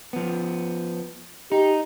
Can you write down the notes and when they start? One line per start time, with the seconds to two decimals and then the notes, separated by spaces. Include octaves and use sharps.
0.13 F3 B3
1.52 D#4 G4